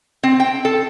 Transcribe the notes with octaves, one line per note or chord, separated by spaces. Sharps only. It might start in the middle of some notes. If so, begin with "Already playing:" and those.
C4
G5
A4